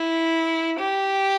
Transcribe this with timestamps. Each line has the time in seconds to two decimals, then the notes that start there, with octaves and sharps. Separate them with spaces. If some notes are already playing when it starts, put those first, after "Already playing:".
Already playing: E4
0.79 G4